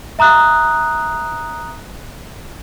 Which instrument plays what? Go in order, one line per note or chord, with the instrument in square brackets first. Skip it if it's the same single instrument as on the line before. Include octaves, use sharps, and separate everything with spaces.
[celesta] E5 A#5 D#6 F#6